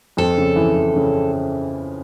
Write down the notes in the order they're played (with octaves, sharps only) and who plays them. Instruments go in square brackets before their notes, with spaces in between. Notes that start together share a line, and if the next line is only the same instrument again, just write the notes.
[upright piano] F2 [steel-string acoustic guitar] A4
[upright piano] C#3
E3
E3
C#3